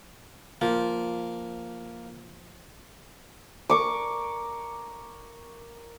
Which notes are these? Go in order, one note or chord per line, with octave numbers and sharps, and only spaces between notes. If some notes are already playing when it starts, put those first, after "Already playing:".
F3 A#3
A#4 C#6 D6